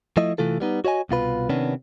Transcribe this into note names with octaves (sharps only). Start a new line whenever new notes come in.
F3 A3 E4 D#5
C3 E3 A3 F4 A4
G3 B3 D#4
F#4 C#5 D#5 G#5
C2 B2 F4 B4
C3 D#3 B3 C#4 D4